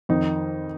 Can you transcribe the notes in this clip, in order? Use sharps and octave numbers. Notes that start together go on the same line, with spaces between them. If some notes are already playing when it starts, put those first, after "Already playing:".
F2 D#3 D#4